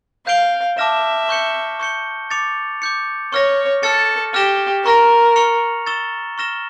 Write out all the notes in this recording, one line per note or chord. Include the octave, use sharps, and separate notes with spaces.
F5 G6 D7 G7
E5 A5 D6 F6 A#6 E7
C#6 G6 C#7 G7
C#6 G6 C#7 G7
D6 A6 C#7 F7
D6 G6 C#7
C#5 C#6 F6 A#6
A4 F6 A6 C#7
G4 F6 A#6 E7 G7
A#4 A#5 C#6 F6 A#6
C#6 F6 C#7 F7
C#6 E6 A6 E7 G7
C#6 F6 A#6 E7 G7